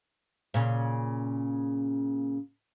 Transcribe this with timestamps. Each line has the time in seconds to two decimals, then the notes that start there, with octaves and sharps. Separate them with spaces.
0.54 A#2 C#3 C#4